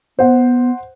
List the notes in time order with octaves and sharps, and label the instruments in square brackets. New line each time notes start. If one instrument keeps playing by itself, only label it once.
[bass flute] B3 [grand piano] C5 F#5